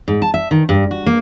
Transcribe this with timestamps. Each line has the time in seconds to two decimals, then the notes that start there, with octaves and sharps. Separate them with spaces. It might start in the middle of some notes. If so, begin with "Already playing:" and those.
0.08 G#2
0.22 A5
0.34 E5
0.51 D#3
0.69 G2
0.91 F#4
1.06 A#3